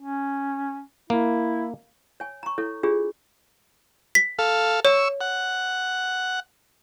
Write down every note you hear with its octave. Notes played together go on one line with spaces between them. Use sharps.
C#4
A#3 E4
C#5 G#5
A#5 C#6
E4 A4 C#5
D4 F4 G4 G#4 C#5
B6
A4 F5
C#5 C#6 E6
F#5